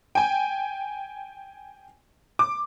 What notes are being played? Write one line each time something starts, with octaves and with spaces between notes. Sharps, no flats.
G5 G#5
D6